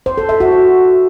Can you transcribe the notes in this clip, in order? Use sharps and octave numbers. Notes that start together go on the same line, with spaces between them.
C5
A4
E5
F#4